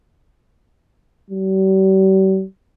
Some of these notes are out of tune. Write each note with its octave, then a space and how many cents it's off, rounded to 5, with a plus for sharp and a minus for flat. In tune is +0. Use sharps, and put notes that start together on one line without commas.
G3 -45